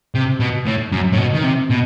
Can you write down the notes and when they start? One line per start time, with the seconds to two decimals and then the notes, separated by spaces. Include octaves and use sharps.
0.15 C3
0.40 B2
0.66 A2
0.92 F#2
1.12 A2
1.18 B2
1.34 D#3
1.44 C3
1.71 B2